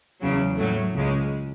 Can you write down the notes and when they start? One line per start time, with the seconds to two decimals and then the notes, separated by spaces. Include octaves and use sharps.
0.20 E2 C#3 F#3
0.57 A2 F#3 A3
0.93 C#2 C#3 G#3